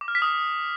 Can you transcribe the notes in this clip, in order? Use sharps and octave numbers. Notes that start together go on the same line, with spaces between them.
D6
F6
B6
D#6